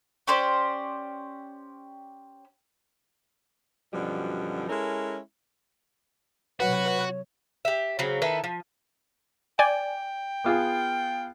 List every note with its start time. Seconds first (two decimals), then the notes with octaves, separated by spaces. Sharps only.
0.27 C#4 G4 C5 D5
3.92 F#2 B2 D3 F3 G3
4.69 G#3 C#4 E4 A4 A#4
6.60 C3 F#3 F#4 B4 C#5 F#5
7.65 G4 E5
7.99 C#3 F#3 C4
8.22 D#3 E4 A4 B4
8.44 F3
9.59 D5 G5 G#5
10.44 B3 F4 G#4